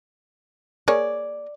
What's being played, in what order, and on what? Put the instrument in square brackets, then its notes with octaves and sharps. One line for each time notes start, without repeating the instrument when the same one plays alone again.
[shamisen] A#3 G#4 C#5 [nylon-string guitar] D5